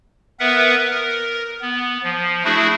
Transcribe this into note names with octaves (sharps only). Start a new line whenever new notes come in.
B3 A#4 B4 E5 F#5
A#4
B3
F3
A3 D4 E4 F#4 G#4